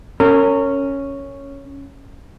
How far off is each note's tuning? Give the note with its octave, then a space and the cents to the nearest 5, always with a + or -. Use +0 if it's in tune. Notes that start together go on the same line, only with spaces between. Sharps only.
C#4 +0 A#4 -35